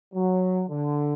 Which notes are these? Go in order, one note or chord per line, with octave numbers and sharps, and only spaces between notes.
F#3
D3